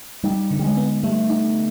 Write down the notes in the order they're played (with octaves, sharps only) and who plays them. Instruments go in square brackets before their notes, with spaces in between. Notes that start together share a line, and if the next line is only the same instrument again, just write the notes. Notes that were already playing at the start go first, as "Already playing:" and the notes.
[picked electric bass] G3 [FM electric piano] D#4
[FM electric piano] D3
[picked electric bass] G3
G#3
[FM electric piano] B3
[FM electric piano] G3 [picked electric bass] A3
[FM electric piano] D#4